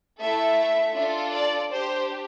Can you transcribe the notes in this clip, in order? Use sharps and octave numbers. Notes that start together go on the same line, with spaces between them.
A3 E4 A4 E5
D4 F4 A4
D5
D4 G4 C5